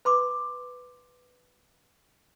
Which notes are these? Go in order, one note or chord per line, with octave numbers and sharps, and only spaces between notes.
B4 C6 D6